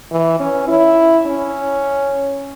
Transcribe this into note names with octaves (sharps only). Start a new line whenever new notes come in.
E3
C#4
E4
C#4